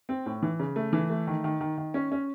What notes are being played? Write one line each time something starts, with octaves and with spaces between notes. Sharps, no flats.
C4
A2
E3
C#3
A3
E3
A3
D#3
D#3
D#3
D#3
C#4
C#4